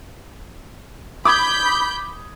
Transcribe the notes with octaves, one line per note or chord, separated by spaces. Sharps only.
B5 D6 D#6 G6 G#6